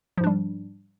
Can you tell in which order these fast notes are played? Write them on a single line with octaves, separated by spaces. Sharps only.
F3 G#2 D4 G3